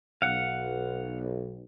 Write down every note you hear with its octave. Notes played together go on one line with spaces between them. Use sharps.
B1 F5 F#5